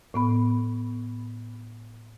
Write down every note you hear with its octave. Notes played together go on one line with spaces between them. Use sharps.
A2 B3 B5